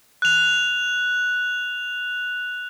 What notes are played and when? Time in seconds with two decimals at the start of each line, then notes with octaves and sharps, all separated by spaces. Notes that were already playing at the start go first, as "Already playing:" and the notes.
0.22 F#6 F7